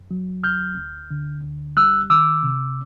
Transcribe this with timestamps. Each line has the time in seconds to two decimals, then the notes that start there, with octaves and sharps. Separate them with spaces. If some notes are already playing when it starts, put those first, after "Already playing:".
Already playing: F#2
0.11 F#3
0.44 D2 F6 G6
0.77 D2
1.11 D3
1.44 D2
1.77 G3 E6 F#6
2.10 D#3 D6 E6
2.43 C3